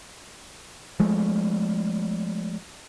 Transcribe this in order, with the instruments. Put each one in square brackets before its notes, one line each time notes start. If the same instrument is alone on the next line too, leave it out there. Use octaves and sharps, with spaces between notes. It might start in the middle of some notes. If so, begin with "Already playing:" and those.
[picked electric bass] F3 G#3 A3